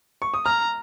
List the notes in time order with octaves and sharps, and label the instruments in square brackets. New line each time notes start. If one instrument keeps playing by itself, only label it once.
[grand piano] C#6
D#6
[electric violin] A#5 [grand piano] F6